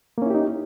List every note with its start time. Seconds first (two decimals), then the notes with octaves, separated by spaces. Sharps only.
0.18 A#3
0.22 C#4
0.26 E4
0.30 G4
0.34 D#4